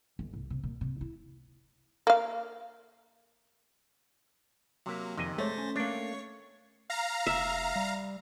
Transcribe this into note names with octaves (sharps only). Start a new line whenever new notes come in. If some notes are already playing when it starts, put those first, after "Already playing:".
G1
C2
C3
A#2
C3
E4
A#3 F5
C3 F#3 A#3 E5
F2 C3 D#3 D#5 G#5
G#3 A3 C5 C#5 A6 A#6
C#4 G#5
A3 A#3 D4 C#5 G5 C#6
F5 A#5
F1 E5
G3